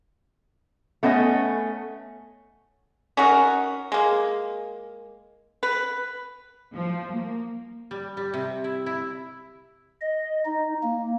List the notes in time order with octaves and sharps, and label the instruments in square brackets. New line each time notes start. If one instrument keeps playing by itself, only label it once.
[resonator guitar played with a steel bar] A3 B3 C#4 D#5 G#5
[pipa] C#4 D#4 F#4 A#4
G#3 A#3
B4
[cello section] F3
A#3
[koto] G3
G3
C3
E4
E4
[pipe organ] D#5
D#4
A#3